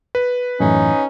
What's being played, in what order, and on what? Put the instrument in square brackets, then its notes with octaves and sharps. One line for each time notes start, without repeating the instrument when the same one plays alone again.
[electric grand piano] B4
[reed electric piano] F#2 A2 E3 [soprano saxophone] C#4 [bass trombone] D#4